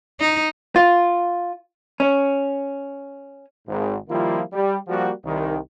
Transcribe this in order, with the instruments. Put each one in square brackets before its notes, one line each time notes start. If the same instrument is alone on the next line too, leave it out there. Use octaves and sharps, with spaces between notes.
[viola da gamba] D#4
[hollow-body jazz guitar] F4
C#4
[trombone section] G#1 G#2
D#3 F3 G3 A#3 E4 F4
G3
F3 G3 A#3 F#4
C2 D#3